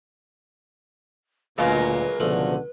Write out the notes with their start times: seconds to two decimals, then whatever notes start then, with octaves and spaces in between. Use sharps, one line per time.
1.58 D2 A#2 C#3 F#3 G#3 A#3 F4 B4
2.20 C#2 B2 D3 F3 A3